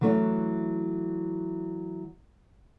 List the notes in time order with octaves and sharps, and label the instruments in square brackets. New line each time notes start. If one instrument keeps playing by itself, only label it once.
[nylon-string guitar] E3 F#3 A3 C#4